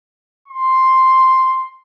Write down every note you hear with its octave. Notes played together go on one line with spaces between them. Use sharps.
C6